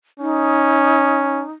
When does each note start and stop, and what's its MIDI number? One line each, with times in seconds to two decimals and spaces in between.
0.20 1.44 61
0.20 1.51 63